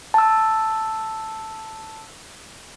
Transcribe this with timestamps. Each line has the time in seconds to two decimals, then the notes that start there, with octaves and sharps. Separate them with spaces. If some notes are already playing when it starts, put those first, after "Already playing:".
0.14 A5 E6